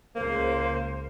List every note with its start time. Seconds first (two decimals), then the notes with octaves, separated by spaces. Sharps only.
0.15 C#2 C#3 A#3 C5